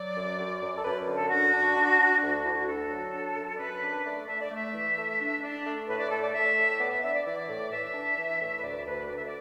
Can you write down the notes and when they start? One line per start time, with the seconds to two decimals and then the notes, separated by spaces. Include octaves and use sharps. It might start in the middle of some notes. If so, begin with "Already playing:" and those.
Already playing: F#3 D5
0.15 F#2
0.38 F#2
0.61 F#2
0.76 A4
0.84 F#2 B4
1.07 D3
1.14 A4
1.29 D4 F#4
1.53 D4
1.75 D4
1.99 D4
2.21 D2 F#4
2.43 D2 E4
2.55 F#4
2.67 D4 A4
2.89 F#3
3.12 D4
3.36 F#2
3.55 D5
3.58 F#2 B4
3.81 D4
4.04 A3 D5
4.27 A3 E5
4.41 D5
4.50 A3
4.55 E5
4.73 E3
4.96 A3
5.19 D4
5.42 D4
5.64 A3
5.87 A2 B4
5.99 D5
6.10 A3 A4
6.22 D5
6.33 A3 E5
6.57 A2
6.79 B3 D5
6.91 E5
7.03 D4 E5
7.14 D5
7.25 E3 D5
7.48 A2
7.71 E3 E5
7.93 D4
8.16 E3
8.40 A2
8.58 B4
8.62 D2 D5
8.85 D2 B4
9.08 D2 D5
9.17 E5
9.25 D5